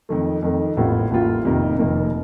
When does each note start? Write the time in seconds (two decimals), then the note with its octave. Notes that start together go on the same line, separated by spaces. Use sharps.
0.09 F2 D#3 A3
0.42 F2 D#3 A3
0.77 A1 A2 G3 A#3 F4
1.11 A1 A2 G3 A#3 F4
1.44 F1 F2 C3 D#3 A#3
1.79 F1 F2 C3 D#3 A#3